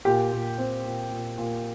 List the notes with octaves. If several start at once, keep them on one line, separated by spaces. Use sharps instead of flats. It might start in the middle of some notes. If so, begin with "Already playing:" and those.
A#2 G4
A#2
C4
A#2
A#2
A#2